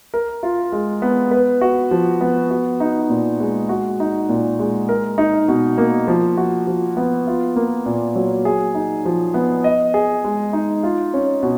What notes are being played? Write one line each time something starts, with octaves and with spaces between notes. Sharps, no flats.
A#4
F4
G#3
B3
B4
F#4
F3
B3
F#4
D#4
A#2
G#3
F#4
D#4
A#2
G#3
A#4
D#4
B2
A#3
F3
F#4
F3
B3
F4
A#3
A#2
F#3
G#4
D#4
F3
B3
D#5
G#4
G#3
D#4
F4
C#4
B2